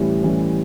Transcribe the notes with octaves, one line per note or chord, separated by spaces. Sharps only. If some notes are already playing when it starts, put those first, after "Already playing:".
Already playing: A2 E3 G3 C#4
A2 E3 G3 C#4